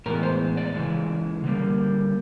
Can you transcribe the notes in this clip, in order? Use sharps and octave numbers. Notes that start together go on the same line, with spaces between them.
A2 E3 G#3 B3 A#4
C5
D5
C#3 E3 G#3
D3 G3 A#3